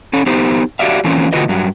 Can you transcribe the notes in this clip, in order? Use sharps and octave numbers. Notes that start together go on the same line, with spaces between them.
C#4 A4
B3 D#4 G4 C5
F#4 G4 B4 D5 E5 F5
E3 F3 A#3 C4 C#4
A2 D3 F4 F#4 B4 D#5
G2 F#3